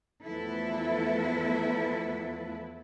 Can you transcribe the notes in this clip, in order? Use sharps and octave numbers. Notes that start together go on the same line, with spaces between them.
E2 F3 A3 E4 A4 B4